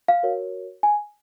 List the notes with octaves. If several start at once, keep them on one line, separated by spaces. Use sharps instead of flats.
F5
F#4 A#4 C#5
G#5